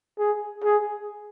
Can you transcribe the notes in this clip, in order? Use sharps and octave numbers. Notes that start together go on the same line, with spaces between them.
G#4
G#4